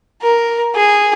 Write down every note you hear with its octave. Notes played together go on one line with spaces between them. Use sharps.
A#4
G#4